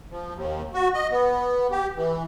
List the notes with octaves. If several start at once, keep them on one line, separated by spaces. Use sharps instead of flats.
F3
D#2
F#4
D#5
B3
G4
E3